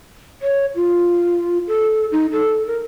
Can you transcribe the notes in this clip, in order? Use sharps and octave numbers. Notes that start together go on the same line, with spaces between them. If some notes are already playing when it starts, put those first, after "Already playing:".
C#5
F4
A4
D#4
A4
A#4